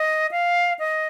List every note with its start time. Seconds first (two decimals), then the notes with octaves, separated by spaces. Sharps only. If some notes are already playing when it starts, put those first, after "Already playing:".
Already playing: D#5
0.31 F5
0.79 D#5